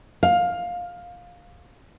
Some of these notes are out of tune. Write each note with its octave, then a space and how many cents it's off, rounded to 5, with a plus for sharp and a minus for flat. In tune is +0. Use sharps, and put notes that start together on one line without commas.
F5 +15